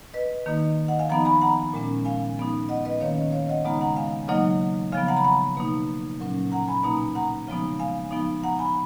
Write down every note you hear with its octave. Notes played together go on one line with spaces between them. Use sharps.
B4 D#5
D#3 A#3 D#4
D#5 F#5
F5 G#5
F3 B3 D#4 F#5 A#5
G#5 B5
F#5 A#5
A#2 G#3 C#4
F5 G#5
F3 B3 D#4
D#5 F#5
B4 D#5
D#3 A#3 C#4 C#5 F5
C#5 F5
D#5 F#5
C#3 G#3 B3 D#4 F#5 A#5
F#5 A#5
F5 G#5
C#3 F#3 A#3 D#4 D#5 F#5
C#3 F3 B3 F5 G#5
F#5 A#5
B5
F#5 A#5
B2 A#3 D#4
A#2 F#3 C#4
F#5 A#5
G#5 B5
B2 A#3 D#4 F#5 A#5
F#5 A#5
C#3 F3 G#3 B3 D#4
F5 G#5
F3 B3 D#4
F#5 A#5
G#5 B5